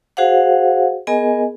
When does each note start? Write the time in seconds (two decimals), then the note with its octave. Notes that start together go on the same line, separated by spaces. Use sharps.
0.17 F#4 G#4 C5 F5 F#5
1.07 B3 G#4 A#4 D#5 G#5